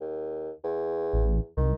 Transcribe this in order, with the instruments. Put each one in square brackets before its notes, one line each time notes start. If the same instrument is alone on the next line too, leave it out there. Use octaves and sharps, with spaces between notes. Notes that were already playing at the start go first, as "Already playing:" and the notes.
[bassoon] D#2
E2
[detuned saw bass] A1
[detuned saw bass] C2 [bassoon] D#3